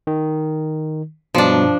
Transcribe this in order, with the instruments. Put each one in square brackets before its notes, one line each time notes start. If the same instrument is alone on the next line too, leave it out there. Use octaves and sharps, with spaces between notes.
[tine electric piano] D#3
[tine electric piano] G2 B2 F#3 [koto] F3 D4